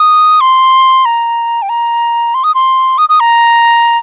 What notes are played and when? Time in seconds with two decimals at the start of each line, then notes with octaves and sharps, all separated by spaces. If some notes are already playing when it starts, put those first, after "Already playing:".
Already playing: D#6
0.40 C6
1.05 A#5
1.62 G5
1.69 A#5
2.34 C6
2.44 D#6
2.54 C6
2.98 D#6
3.09 D#6
3.20 A#5